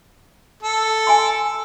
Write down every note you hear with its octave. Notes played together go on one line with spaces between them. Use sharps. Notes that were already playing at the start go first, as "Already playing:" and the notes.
A4
G#5 C6